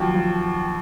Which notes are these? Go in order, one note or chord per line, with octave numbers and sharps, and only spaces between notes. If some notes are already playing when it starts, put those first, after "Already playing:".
Already playing: D#2 D#3 F3 F#3
F3